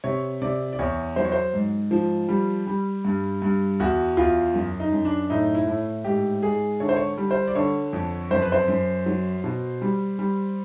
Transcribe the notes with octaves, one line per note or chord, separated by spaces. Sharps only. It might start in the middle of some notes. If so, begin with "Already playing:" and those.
C3 C#5
C3 D5
D5
E2 C#5
F#3 C5
C#5
C5
G#2
F3
G3
G3
G2
G2
E2 F#4
E2 F4
F#2
D#4
F#2
D4
A2 D#4
E4
A2
G#2 G4
G#2 G#4
D3 C#5
C5
C#5
G3
C5
D5
D3 C#5
F2
F#2 C5
B4
C5
F#2
F#3
B2
G3
G3